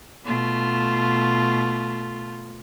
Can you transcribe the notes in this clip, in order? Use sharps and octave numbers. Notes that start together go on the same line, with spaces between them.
B2 A3 F4